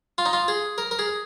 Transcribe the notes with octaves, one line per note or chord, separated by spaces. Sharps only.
F4
D#4
F4
G#4
A#4
A#4
G#4